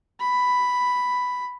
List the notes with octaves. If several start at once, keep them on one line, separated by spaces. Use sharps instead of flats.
B5